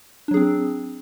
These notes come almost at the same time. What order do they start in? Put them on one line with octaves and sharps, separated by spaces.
D4 F#3 G#4 C4